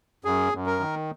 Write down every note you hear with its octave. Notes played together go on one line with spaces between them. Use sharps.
F#2 G#4
F#2
A#4
D#3